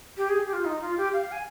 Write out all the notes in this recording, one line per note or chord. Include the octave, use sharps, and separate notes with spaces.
G4
G#4
G4
F4
D#4
F4
G4
F5
G#5